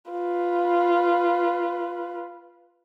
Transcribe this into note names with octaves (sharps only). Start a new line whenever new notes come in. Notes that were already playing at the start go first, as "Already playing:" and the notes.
F4 B4